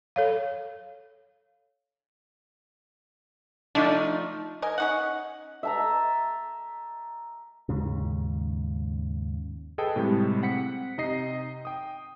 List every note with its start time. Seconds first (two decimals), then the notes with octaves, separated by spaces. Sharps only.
0.16 A4 C#5 F5
3.75 F3 A3 D4 D#4
4.62 A#4 D#5 G#5
4.78 C#4 D#4 F#5
5.63 E5 A5 A#5
7.69 D#2 G#2 C#3
9.78 G#4 A4 B4 D#5 G5 D#6
9.96 A2 C3 G3 G#3
10.42 C4 F#5 B6 C#7
10.98 C3 D#4 D#5 C7
11.65 G5 D#6